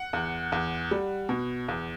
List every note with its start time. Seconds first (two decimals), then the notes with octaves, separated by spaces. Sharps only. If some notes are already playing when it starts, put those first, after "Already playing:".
Already playing: F#5
0.13 E2
0.52 E2
0.91 G3
1.29 B2
1.68 E2